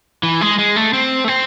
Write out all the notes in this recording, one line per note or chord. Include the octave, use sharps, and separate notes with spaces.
E3
G#3
G#3
A3
C4
A3
C4